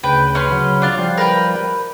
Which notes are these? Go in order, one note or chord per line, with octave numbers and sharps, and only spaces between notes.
D2 C#3 B4 G5
C#4 B4 C6
C#3 F#3
D4 F4
F3 G3
A#4 B4 G5